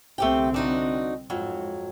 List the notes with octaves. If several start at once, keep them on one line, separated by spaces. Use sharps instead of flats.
C2 D3 A3 C4 G4 G5
D4 D#4 F#4
F2 G#2 F#3